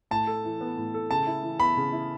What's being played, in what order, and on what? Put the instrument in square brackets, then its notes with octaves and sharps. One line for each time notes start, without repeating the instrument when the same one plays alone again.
[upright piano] A2 [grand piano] A5
[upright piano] A4
E3
B3
A2
A4
[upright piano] C#3 [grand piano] A5
[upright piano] E4
E3
[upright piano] B3 [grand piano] B5
[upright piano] C#3
E4